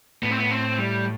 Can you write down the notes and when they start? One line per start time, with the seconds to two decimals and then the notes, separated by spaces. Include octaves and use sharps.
0.23 A2 B3
0.31 C4
0.38 B3
0.51 C4
0.78 G3